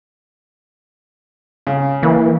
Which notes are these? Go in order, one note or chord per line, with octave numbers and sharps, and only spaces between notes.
C#3
E3 A#3